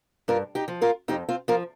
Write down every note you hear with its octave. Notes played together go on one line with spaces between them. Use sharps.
G2 F4 A#4
D#4 G4
F3
F4 A#4
F2 D#4 G4
C4 F4
F3 F4 A#4